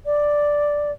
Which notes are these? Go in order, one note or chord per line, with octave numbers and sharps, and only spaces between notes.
D5